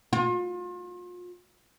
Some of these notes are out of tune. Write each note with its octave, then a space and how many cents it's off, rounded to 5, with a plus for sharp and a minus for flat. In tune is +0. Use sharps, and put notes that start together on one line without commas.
F4 +35